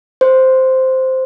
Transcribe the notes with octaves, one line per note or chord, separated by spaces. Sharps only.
C5